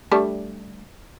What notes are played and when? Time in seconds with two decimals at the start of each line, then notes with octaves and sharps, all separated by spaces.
0.12 G3 A3 D4